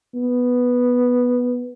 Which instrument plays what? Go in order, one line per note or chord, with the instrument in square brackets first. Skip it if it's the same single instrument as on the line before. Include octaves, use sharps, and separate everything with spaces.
[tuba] B3